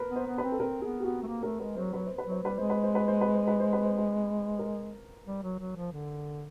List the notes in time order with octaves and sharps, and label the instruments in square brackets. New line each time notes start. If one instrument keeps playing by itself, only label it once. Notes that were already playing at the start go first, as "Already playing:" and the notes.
Already playing: [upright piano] A#4 B4
[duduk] B3
[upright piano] C5
[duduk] B3
[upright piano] B4
[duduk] C4
[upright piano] A4
[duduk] C4 [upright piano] A#4
[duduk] B3 [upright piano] G#4
[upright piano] G4
[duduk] B3 [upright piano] F#4
[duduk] A3
A#3
[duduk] A3 [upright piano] A#4
[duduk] G#3 [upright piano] B4
[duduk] F#3 [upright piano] C5
[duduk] F#3 [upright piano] B4
[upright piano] C5
B4
[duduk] F#3 [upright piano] C5
[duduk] G3 [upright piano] B4
[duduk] G#3 [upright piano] C5
[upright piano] B4
C5
B4
C5
B4
C5
B4
C5
B4
C5
B4
A#4
[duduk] G3
F#3
F#3
F3
D3